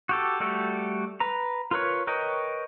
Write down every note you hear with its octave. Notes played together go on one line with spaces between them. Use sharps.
F#4 G4 A4
G3 A3 F#4 G4 A4
B4 A#5
F4 A#4 B4 C#5
A#4 B4 C#5 D#5 G5